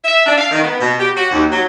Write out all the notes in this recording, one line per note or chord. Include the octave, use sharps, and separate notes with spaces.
E5
D4
F5
D#3
B3
B2
G4
F#4
D#2
F#3